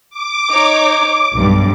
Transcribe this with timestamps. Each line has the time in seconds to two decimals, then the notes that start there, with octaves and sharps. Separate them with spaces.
0.10 D6
0.51 D#4 C#5
1.34 B1 G2